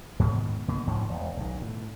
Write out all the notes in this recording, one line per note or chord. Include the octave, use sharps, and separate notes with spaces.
G#2 B2 D#3
B2 A#3
A1 G#2 D#3 F3
E1
B1 D#3
A2